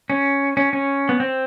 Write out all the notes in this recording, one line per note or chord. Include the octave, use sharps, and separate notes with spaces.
C#4
C#4
C#4
B3
C4